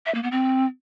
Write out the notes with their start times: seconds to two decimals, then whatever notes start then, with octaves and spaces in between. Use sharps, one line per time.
0.06 E5
0.15 A#3
0.23 B3
0.32 C4